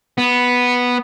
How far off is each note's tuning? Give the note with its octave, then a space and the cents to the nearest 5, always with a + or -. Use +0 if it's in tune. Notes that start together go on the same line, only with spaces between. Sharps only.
B3 -5